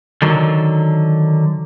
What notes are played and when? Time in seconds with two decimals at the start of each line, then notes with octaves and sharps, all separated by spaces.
0.22 D3 D#3 F#3